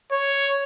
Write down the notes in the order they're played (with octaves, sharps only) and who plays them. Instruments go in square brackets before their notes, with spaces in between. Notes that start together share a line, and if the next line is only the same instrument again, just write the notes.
[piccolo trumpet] C#5